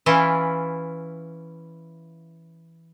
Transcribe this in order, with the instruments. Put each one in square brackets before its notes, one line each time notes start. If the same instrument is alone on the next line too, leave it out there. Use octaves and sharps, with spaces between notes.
[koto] E3 C#4 E4 F4